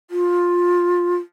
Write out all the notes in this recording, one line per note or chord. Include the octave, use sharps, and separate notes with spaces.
F4